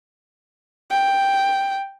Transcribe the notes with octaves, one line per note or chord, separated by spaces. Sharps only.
G5